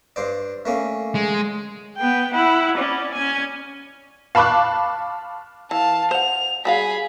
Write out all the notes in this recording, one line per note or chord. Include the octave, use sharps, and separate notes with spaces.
G2 C5 D5
A3 A#3 C#4
G#3
B3 G5
E4 F#5
C#4 D5
C#4 G#5
F5 A5 B5 C#6 D6 F#6
E3 F5 A5
C5 F#5 F7
G3 F#4 G#4 F5 B5